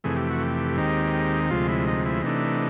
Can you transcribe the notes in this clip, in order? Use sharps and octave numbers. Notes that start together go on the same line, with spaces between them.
F2 C3 E3 A3 G#4
G4
F#4
G4
D#2 D#3 G#3 C4 D#4
D2 C3 F3 G#3 F4
E4
D#4
E4
C3 E3 A3 D4 D#4